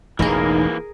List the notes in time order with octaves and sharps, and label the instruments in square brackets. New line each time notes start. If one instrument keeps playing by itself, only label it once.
[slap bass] E1 A1 E2 [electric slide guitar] E3 A#3 [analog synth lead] D#4 [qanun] G#4 A#4